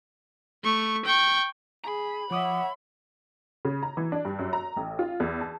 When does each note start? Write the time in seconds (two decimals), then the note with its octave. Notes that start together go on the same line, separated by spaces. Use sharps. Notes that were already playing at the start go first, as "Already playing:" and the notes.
0.64 A3 C#6
1.05 G5 C#6
1.84 G#4 A#5 B5
2.31 F3 C#5 E5 F#5 D6 D#6
3.65 C#3
3.83 A#5
3.97 E3
4.12 D4
4.25 G2
4.39 F#2
4.53 A#5
4.76 A1
4.99 F4
5.20 E2
5.41 A5